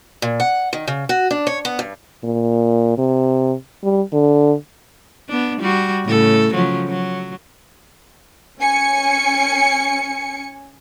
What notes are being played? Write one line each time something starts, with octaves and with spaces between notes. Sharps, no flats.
A#2
F#5
D#3
C#3
F#4
D4
C#5
B3
G2
A#2
C3
G3
D3
B3 D4
G3 F#4
A2 C#3 A4
C#3 F3 F#3
F#3
C#4 G#5 C#7